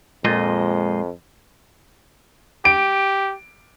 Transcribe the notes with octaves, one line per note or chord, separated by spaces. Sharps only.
F2 A#2 G#3 C5 D#5
G4 D7